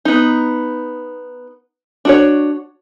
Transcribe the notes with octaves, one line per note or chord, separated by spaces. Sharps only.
B3 D#4
D4 F#4 C#5